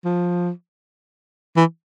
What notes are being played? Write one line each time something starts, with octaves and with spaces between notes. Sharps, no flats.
F3
E3